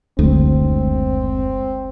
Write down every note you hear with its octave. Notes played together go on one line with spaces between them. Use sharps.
F#1 D2 G#3 C4